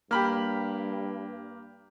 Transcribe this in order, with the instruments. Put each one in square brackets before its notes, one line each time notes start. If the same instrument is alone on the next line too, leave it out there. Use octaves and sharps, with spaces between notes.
[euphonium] G2 [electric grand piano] A#3 [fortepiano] G4 B5 F6